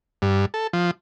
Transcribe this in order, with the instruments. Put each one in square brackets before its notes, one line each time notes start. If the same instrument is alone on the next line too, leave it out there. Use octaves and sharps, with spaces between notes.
[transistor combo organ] G2
A4
F3